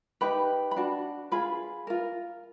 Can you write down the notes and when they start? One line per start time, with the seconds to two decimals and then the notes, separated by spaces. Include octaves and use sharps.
0.21 D#4 G4 B4 B5
0.71 B5
0.76 D4 F#4
1.32 F4 G#4 B4 B5
1.87 F4 A#4